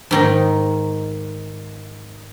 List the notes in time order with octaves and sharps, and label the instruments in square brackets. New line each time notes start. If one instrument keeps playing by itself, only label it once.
[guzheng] G#2 D#3 D#4